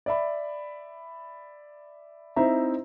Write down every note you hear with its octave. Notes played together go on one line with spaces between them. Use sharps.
D5 E5 B5
C4 D#4 E4 C5 E5 A#5